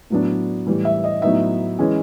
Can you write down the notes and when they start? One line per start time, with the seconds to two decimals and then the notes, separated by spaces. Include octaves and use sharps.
0.10 A2 F#3 B3 D4
0.66 A2 E3 G3
0.85 E5
1.04 D#5
1.22 A2 F#3 B3 D#4 E5
1.79 E3 G#3 C#4